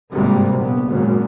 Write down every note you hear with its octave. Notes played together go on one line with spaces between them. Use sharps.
G#1 G2 C3 G3 A#3
A#1 B3
G#1 F#2 A#2